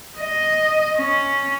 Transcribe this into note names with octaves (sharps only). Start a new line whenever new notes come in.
D#5
C#4